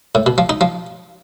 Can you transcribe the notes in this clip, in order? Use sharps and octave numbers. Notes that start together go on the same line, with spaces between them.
A2
B2
F3
D#4
F3